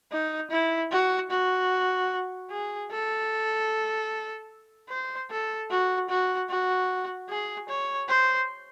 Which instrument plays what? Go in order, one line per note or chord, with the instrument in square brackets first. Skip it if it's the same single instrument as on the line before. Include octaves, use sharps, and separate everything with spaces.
[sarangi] D#4
E4
F#4
F#4
G#4
A4
C5
A4
F#4
F#4
F#4
G#4
C#5
C5